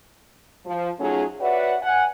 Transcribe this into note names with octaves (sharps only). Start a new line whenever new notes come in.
F3
F#3 A3 C#4 D#4 F4 G#4
F#4 B4 C#5 D5 E5 F#5
F#5 G#5